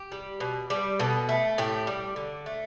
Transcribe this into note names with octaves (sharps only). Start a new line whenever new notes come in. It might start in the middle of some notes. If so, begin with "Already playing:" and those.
Already playing: G4
G3
B2
G3
B2 A4
A3
A2 G4
G3
D3
A3